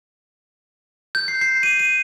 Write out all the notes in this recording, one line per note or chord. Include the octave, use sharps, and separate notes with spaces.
G6
C7
C7
D#7
D#7